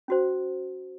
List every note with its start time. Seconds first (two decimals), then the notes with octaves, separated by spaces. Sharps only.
0.08 C#4 F#4 C5